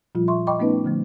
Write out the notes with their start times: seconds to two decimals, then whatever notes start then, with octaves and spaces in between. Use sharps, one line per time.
0.15 A#2 F3 G3 F4
0.28 E5 C6 C#6
0.47 D#5 G5 B5 C#6 D6
0.59 A3 B3 C#4 D#4 B4
0.85 D3 F3 A3